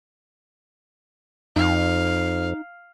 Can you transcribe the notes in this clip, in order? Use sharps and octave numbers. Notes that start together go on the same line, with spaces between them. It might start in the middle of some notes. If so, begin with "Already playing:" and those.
F2 D#4 F5